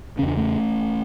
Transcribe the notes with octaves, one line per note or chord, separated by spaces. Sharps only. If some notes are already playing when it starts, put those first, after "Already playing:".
E2 C#3 C#4
D4
A3 C#4